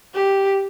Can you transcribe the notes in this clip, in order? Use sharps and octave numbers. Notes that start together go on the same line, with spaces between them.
G4